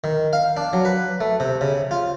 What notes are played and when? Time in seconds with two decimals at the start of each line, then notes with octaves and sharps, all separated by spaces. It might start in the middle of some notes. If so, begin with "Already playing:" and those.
0.04 D#3
0.33 F5
0.57 D4
0.73 F#3
0.85 B4
1.21 A3
1.40 C3
1.61 C#3
1.91 F4